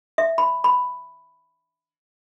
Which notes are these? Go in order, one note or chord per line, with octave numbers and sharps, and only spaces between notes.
E5
B5
B5